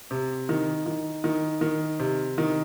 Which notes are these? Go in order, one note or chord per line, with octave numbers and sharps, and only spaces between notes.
C3
D#3
D#3
D#3
D#3
C3
D#3